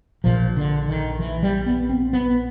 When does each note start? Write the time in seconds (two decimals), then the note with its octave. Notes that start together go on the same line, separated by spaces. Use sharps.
0.24 A#1 A#2 F3
0.57 D3
0.88 D#3
1.19 E3
1.43 G3
1.66 B3
1.89 C4
2.13 B3